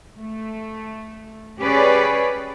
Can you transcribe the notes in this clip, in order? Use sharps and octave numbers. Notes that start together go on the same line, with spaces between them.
A3
C#4 G4 G#4 B4 C#5 D5